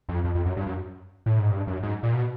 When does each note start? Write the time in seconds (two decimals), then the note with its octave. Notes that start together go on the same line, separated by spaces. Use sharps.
0.09 F2
0.24 F2
0.35 F2
0.46 F#2
0.56 G2
0.66 F#2
1.26 A2
1.39 G#2
1.51 G2
1.67 F#2
1.83 G#2
2.03 A#2
2.14 B2